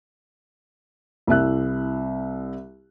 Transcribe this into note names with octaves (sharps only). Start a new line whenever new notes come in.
C2 E4 E5 F#6